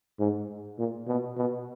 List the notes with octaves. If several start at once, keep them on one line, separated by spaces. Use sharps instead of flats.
G#2
A#2
B2
B2